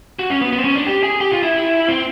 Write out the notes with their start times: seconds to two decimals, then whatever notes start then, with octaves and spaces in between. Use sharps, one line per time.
0.19 F#4
0.30 C#4
0.42 B3
0.53 B3
0.59 C4
0.64 C#4
0.76 D4
0.86 G4
1.03 G#4
1.21 G4
1.32 F4
1.43 E4
1.88 C4